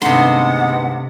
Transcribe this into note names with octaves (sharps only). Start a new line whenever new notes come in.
G2 C3 D#3 G#3 A3 B3 F#5 C6